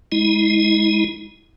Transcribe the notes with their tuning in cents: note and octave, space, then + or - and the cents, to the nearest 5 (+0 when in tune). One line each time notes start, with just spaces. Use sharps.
G#3 +0 E4 -35